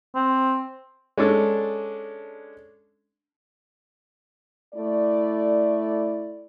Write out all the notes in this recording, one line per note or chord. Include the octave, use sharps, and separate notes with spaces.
C4
G#3 C#4 D4 A4
A3 E4 D5